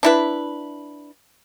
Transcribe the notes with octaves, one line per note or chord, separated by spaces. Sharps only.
D4 E4 B4